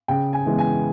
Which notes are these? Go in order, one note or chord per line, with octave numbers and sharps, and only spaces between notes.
C#3 G5
G#5
E3 G#3 B3
G#5